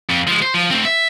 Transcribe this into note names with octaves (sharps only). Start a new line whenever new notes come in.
F2
F3 G#3
C5
F3
A3 C4
E5